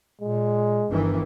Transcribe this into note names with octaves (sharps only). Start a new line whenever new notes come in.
A#2 G#3
G1 G2 D#3 E3